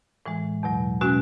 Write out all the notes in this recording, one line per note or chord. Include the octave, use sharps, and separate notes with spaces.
A2 E3 G#3
E2 B2 F#3
B2 G#3 C#4 F#4